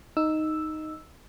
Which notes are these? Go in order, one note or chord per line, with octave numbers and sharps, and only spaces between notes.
D#4 E6